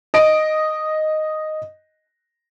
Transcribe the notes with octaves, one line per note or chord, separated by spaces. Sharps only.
D#5 D7